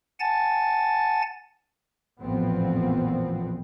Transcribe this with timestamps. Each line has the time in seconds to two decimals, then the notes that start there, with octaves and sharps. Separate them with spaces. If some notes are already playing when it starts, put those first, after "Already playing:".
0.20 F#5 G#5 A5 A6
2.21 A1 F2 A#2 F3 B3 C4